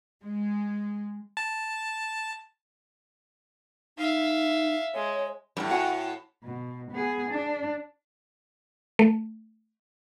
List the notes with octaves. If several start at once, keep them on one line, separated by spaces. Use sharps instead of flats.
G#3
A5
D#4 E5 F5
G#3 C#5
F#2 A2 G3
F#4 F#5 G#5
B2
B3 G#4
D4
A3